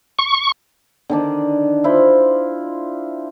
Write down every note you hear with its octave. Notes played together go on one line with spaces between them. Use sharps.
C#6
D3 D#3 D4
E4 F4 C5 D5